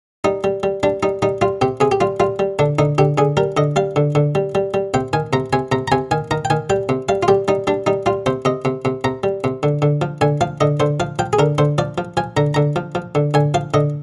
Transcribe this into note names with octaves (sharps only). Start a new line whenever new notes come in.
G3 D#4
G3
G3
G3 D4
G3 D#4
G3 D#4
G3 F4
C3 G4
C3 G#4
G4
G3 F4
G3 F4
G3
D3 D4
D3 D#4
D3 G4
D3 G#4
G3 A#4
D3 D#5
G3 F5
D3
D3
G3
G3
G3
C3 G5
D#3 G#5
C3 A#5
C3 G#5
C3 A#5
A#5
C3 G#5
D#3 G#5
D#3 A#5
G5
D#3 G#5
G3 G5
C3
G3 F5
F4
G3 G4
G3 D#4
G3 D4
G3 D#4
G3 F4
C3 C5
C3 D#5
C3
C3
C3 A#5
G3
C3
D3
D3
F3
D3 G#5
F3 F5
D3 D#5
D3 C5
F3 F5
F3 G5
G#4
D3 A#4
D3 C5
F3 D5
F3
F3 G#5
D3 A#5
D3 A#5
F3
F3
D3
D3 G#5
F3 F5
D3 D#5